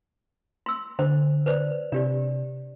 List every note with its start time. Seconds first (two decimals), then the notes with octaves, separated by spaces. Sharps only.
0.66 C6 E6
0.99 D3 C5
1.46 B4 C5 D5
1.92 C3 D4 G4 D5